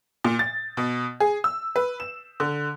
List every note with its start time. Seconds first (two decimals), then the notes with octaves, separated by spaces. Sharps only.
0.24 A#2
0.39 A6
0.77 B2
1.20 G#4
1.44 E6
1.76 B4
2.00 E7
2.40 D3